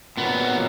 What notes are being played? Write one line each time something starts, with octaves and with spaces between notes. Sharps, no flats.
A#2 F#3 B3